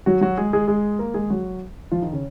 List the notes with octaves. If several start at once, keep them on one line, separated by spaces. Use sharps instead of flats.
F#3 F#4
F#3 F#4
G#3 G#4
G#3 G#4
G#3 G#4
A#3 A#4
G#3 G#4
F#3 F#4
F3 F4
D#3 D#4
C#3 C#4